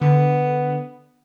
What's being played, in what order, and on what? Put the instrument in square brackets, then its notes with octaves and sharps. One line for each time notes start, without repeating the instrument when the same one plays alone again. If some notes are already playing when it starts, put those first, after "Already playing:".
[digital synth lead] D3 [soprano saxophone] B3